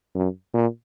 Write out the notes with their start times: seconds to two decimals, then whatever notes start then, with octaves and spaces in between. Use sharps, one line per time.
0.15 F#2
0.54 A#2